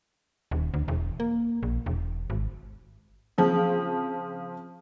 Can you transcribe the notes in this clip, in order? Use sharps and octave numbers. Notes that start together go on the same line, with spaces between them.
D#1
D2
E1
A#3
A#1
E1
G#1
C#3 F3 C4 F4